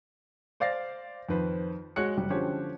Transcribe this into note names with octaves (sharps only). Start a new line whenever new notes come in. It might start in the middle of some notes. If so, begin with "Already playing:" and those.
C5 D5 F5 A6 A#6 C7
F2 D#3 B4 C5
G#3 F#4 C#5 F#6 C#7
F#1 G3 G4
D3 F3 C#4 G4 C5 C#5